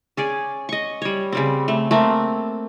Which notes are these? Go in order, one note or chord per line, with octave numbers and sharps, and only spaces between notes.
C#4 G#4 D5
D#5 C#6
G3 C#5
C#3 G3 C4
A3
A3 A#3 C4